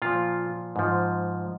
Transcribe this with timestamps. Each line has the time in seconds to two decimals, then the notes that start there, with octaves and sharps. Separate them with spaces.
0.02 A#2 F3 F4
0.76 G#2 F3